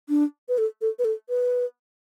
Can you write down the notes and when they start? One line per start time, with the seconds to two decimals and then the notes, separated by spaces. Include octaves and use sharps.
0.09 D4
0.49 B4
0.58 A4
0.81 A4
0.99 B4
1.04 A4
1.29 B4